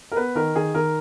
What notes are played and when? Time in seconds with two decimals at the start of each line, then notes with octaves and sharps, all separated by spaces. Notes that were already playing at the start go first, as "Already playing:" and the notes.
0.12 A#4
0.16 B3 B4
0.35 D#3 A#4
0.55 D#3 G#4
0.74 D#3 A#4